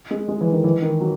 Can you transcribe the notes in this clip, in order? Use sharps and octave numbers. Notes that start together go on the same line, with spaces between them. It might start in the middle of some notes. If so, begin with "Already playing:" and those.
G#3
G#3
E3
D#3
E3
D#3
F#3